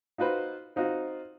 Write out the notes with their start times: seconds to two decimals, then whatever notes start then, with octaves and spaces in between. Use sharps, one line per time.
0.18 D#4 F4 F#4 B4 C5
0.76 C4 D#4 F4 F#4